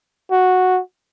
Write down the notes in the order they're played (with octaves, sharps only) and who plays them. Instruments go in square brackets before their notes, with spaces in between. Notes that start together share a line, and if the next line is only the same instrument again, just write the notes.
[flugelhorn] F#4